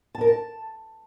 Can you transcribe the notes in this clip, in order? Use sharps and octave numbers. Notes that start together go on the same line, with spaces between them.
A5
A#4
A5